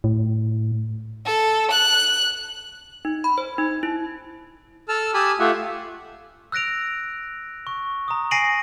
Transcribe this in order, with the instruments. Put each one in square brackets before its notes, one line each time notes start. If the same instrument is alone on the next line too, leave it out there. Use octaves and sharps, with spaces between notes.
[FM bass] A2
[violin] A4
F#6
[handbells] D#4
B5
C5
D#4
E4
[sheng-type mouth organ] A4 A5 E6 F6
G4 G#5 A5 B5 D#6 E6
A3 F4 G4 E5 F#5
[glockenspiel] E6 F#6 A#6 D7 F7
C#6
A#5 D#6
G#5 A#6 C7 D7 D#7 F#7